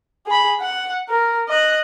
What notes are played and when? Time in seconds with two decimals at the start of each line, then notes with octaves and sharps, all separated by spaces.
0.26 G#4 B5
0.60 F#5
1.09 A#4
1.49 D#5 F#6